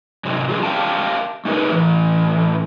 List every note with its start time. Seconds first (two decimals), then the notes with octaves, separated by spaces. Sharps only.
0.25 G#2 C3 F#3
0.49 F#3 F4 G#4
0.63 G4 A#4 F5 G5 A5
1.45 A3 D#4 G#4 A#4 B4
1.72 A2 E3